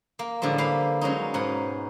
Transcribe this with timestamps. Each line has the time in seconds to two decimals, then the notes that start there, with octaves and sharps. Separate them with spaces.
0.19 A#3
0.42 A2 D3 F3 G3 G#3
0.58 A#3 B4 F5
1.01 F#3 G#3 C#4 D#4
1.34 G#2 B2 B4 F#5